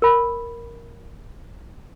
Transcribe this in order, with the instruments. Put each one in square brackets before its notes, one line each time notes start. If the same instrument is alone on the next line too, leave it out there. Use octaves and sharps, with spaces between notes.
[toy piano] A#4 B5